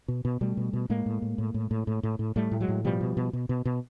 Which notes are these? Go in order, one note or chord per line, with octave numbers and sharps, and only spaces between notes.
B2
B2
B2 G3 A3
B2
B2
A2 G#3 A#3
A2
A2
A2
A2
A2
A2
A2
A2
A2 G3 A3
A2
F#3 G#3
A2
B2 F3 G3
B2
B2
B2
B2
B2